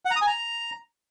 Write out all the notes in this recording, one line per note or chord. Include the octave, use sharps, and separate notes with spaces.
F#5
A#5
D#6
G#5
A#5